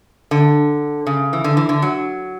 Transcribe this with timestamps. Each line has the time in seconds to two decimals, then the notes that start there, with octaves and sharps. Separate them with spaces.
0.31 D3
1.07 C#3
1.33 E3
1.44 D3
1.57 E3
1.69 D3
1.82 F#3